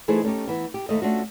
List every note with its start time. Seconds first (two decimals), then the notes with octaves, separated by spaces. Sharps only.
0.08 E3 A3 D#4 G#4 C5
0.23 A3 C#4 D#4 G4
0.47 E3 B3
0.74 G4
0.89 D#2 A#2 A3 D#5
1.02 A3 C#4 D4 F4 F#4